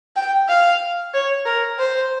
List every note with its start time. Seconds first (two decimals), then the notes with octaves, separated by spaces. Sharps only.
0.16 G5
0.48 F5
1.13 C#5
1.46 A#4
1.79 C5